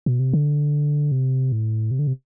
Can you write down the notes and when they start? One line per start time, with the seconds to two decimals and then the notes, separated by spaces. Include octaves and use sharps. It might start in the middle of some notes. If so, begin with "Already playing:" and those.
0.06 B2
0.20 C3
0.33 D3
1.12 C3
1.52 A2
1.91 C3
1.99 D3
2.07 C3